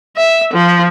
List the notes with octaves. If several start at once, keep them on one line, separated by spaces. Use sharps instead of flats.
E5
F3